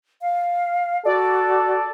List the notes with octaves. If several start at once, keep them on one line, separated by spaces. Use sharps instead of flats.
F5
F#4 A4 D5